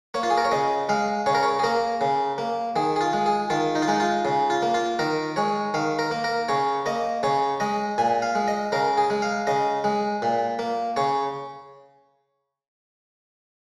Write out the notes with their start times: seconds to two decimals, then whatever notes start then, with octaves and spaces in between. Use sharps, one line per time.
0.14 A#3 C#5
0.23 F4
0.30 G#4
0.38 A#4
0.45 C#5
0.52 C#3 D#5
0.89 G#3 F5
1.26 C#3 C#5
1.35 A#4
1.43 C#5
1.59 G#4
1.64 A#3 A#4
2.01 C#3
2.38 A#3
2.76 D#3 G#4
2.96 G#4
3.01 F4
3.13 G#3
3.26 G#4
3.50 D#3 F4
3.75 D#4
3.82 F4
3.88 G#3 D#4
4.00 F4
4.25 C#3
4.50 F4
4.63 A#3
4.74 F4
4.99 D#3 A#4
5.36 G#3 C#5
5.74 D#3 F5
5.99 A#4
6.11 A#3
6.24 A#4
6.48 C#3 C#5
6.86 A#3 D#5
7.23 C#3 C#5
7.60 G#3 D#5
7.98 A#2 G#5
8.22 F5
8.35 G#3
8.48 D#5
8.72 C#3 A#4
8.98 G#4
9.10 G#3
9.22 F5
9.47 C#3 D#5
9.84 G#3
10.22 A#2
10.59 A#3
10.96 C#3 C#5